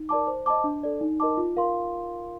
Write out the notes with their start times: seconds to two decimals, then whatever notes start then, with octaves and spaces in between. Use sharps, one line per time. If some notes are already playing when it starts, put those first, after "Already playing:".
Already playing: D#4
0.09 A#4 D5 A5 D6
0.27 C5
0.46 D#5 A5 D6
0.64 D4
0.83 A4 D5
1.01 D#4
1.20 A#4 D#5 A5 D6
1.37 F4
1.57 A#4 F5 C6